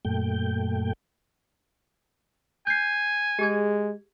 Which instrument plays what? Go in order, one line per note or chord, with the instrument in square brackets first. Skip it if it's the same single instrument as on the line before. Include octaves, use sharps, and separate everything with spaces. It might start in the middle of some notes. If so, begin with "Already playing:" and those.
[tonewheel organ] F#2 A#2 A3 G5
[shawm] G#5 [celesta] G6 C7
[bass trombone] G#3 [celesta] G4 G#4 G#6